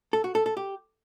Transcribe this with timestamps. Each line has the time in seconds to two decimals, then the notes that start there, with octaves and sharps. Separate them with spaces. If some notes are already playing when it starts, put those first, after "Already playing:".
0.13 A4
0.24 F#4
0.35 A4
0.46 A4
0.57 G4